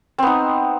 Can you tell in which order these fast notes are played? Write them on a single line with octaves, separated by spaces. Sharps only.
C4 B3 D#4